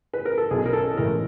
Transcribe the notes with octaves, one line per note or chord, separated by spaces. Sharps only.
B4
A#4
A4
B1 G#4
A#4
A4
A2 E3 G#3 A#4